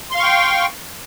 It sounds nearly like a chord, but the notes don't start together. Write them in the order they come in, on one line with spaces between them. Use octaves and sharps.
C6 F5 C#6 G5